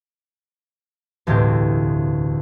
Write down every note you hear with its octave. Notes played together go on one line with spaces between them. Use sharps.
E1 D2 A2 C4 G4